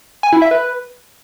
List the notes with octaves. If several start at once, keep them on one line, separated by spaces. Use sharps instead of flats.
G#5
E4
E5
B4